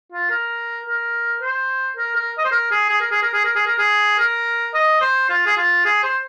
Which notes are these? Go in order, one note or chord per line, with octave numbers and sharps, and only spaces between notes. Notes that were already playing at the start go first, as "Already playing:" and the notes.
F4
A#4
A#4
C5
A#4
A#4
D#5
C5
A#4
G#4
G#4
A#4
G#4
A#4
G#4
A#4
G#4
A#4
G#4
A#4
D#5
C5
F4
G#4
F4
G#4
C5